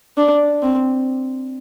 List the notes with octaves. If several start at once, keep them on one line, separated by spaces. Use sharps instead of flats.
D4
C4